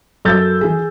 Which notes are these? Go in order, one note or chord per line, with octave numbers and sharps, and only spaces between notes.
F#2 A4 E6 G6 A6
E3 G#4